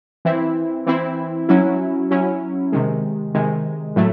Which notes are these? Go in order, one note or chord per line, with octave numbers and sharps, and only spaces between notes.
E3 C4 E4
E3 C4 E4
F#3 C#4 E4
F#3 C#4 E4
C3 D#3 G#3
C3 D#3 G#3
A2 F#3 A3